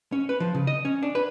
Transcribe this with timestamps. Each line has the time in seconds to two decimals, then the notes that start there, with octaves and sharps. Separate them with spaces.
0.12 C#4
0.29 B4
0.40 F3
0.55 C#3
0.67 D#5
0.85 C#4
1.03 D4
1.15 B4